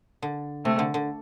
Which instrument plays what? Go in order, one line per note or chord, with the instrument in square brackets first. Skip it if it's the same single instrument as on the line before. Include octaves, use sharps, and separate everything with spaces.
[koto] D3
[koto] C3 [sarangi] A3
[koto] D3
D3